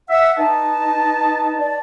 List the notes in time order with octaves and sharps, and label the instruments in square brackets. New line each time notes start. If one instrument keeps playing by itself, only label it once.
[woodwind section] E5 [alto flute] F#5
[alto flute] D#4 [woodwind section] B4 D#5 A5
[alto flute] D5